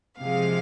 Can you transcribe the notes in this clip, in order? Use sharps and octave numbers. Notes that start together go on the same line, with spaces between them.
C3 F3 G#3 F5